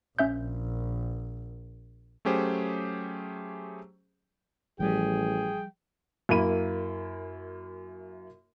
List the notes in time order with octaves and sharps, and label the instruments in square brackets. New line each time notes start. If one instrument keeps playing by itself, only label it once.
[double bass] A#1 [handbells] C#4 E5 G6
[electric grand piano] F#3 A3 C#4 G4 G#4 C5
[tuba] A1 [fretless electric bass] F3 G3 [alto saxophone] G#4 [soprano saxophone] G5
[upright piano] F#2 A#3 E4 B5 D#7